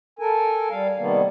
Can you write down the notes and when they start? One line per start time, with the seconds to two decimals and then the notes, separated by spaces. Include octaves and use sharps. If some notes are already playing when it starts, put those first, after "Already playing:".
0.19 A4 A#4 G#5
0.70 G3 F5
0.98 C3 D#3 G3 A#3 B3